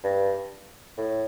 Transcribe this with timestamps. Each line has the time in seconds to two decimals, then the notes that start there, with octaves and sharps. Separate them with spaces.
0.04 G2
0.97 A2